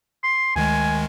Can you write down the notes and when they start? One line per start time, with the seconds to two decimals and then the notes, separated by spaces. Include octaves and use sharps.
0.23 C6
0.56 D2 D#3 G#3 G#5